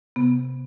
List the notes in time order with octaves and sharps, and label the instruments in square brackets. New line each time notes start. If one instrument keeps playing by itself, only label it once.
[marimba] C3 B3